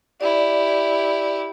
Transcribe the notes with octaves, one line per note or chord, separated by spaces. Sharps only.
E4 G4 D5